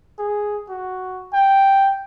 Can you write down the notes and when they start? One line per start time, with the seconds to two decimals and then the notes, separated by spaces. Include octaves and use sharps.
0.19 G#4
0.69 F#4
1.33 G5